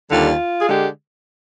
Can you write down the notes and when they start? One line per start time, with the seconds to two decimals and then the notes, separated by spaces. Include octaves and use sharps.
0.10 D#2 D3 G3 F4
0.62 G#4
0.69 D3 G#3 G4